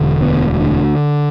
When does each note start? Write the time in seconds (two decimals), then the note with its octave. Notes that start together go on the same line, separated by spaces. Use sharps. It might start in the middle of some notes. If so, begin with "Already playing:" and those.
Already playing: E1 D3
0.21 D2 B3
0.61 D3